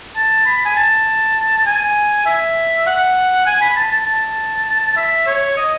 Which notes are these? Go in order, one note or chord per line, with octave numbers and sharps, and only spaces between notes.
A5
B5
G#5
A5
G#5
E5
F#5
G#5
B5
A5
A5
A5
E5
C#5
D#5